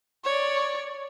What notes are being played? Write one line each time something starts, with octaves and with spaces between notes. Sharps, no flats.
C#5 D5